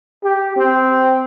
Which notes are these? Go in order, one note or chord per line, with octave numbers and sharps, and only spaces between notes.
G4
C4